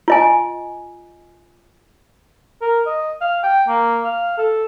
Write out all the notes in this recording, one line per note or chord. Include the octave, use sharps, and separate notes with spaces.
F4 D#5 G#5
A#4
D#5
F5
G5
A#3
F5
A4